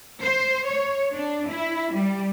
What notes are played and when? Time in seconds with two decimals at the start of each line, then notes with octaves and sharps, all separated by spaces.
0.22 C5
0.67 C#5
1.14 D4
1.49 E4
1.96 G3